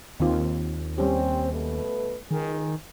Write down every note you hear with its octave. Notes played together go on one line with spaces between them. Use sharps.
D#2 D#3 C4 F4
G3 C4 C#4 G4
B2 A3 B4
C#2 D#3 G#4